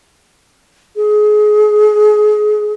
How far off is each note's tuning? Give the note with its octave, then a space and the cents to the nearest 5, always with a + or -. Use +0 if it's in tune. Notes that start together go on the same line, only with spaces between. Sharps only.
G#4 +25